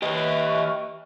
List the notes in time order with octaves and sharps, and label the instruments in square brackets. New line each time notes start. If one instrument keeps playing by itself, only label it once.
[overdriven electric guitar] G4 D#5 [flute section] B4 E5 C#6